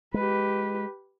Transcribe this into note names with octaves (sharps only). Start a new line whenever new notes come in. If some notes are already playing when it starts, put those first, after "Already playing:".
G#3 G4 B4